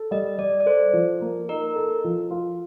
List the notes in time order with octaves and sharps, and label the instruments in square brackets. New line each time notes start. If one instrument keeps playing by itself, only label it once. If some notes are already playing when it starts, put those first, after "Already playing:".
Already playing: [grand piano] A4
[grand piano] G3 [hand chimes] D#5
[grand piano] G3 [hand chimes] D5
[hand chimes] D5
[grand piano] A4 [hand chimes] C5
[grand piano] F3
A#3
[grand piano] D#4 [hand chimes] A#4
[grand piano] A4
F3
F4